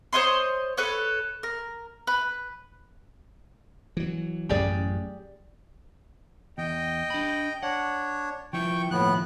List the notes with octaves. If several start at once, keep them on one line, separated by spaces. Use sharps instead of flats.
C5 C#5 D#5 C6
A4 B4 C#5
A#4
B4
E3 F#3
A1 F#2 G4 G#4 D5
E2 D#5 G5
D4 B5
D4 C#5 F#5
F3 E4 G5 C#6
D#2 A2 F3 B3 F#6